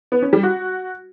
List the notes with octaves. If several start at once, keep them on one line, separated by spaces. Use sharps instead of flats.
B3
C#4
G3
F#4